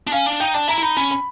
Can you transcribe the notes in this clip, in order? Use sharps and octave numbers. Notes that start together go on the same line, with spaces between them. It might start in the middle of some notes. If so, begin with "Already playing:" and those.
D4
C#4 F5
D4
D#4 G5
D4 A5
E4 A#5
E4
D#4 B5
C#4 B5
B5